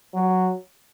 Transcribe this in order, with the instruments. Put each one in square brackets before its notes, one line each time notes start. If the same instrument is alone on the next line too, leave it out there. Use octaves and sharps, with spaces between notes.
[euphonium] F#3